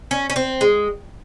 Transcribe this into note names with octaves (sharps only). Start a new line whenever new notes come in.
C#4
C#4
C4
G#3